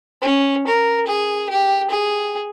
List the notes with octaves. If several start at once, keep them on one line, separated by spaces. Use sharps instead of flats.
C#4
A#4
G#4
G4
G#4